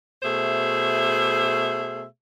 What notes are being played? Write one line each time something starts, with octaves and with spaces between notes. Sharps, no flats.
B2 A3 G#4 C5 E5